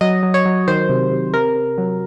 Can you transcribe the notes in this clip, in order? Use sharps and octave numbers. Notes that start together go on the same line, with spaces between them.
F#3 D#5
F#3
C#5
F#3
D#3 C5
C3
C3
C3 A#4
C3
F#3